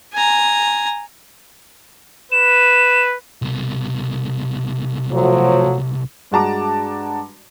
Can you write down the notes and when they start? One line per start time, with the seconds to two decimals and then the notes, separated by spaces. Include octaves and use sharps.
0.13 G#5 A#5
2.32 B4 E7
3.42 C2 B2
5.12 F3 F#3 A3
6.31 G2 G#3 F#4 A5 A#5 D6